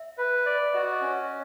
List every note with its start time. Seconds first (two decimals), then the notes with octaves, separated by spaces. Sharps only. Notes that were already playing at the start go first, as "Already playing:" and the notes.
Already playing: E5
0.18 B4
0.46 D5
0.74 F#4 D#5
1.02 C#4